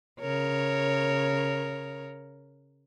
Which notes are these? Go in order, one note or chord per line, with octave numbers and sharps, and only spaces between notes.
C#3 A#4 C#5